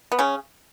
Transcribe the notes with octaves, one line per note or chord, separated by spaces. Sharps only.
B3
C#3 C#4